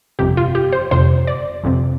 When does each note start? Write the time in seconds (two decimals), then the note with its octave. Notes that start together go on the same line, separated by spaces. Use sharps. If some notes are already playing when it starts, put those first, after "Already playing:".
0.19 G1 F2 C3 G4
0.37 F4
0.55 G4
0.73 C5
0.91 G1 F2 C3 C5
1.27 D5
1.63 G1 F2 C3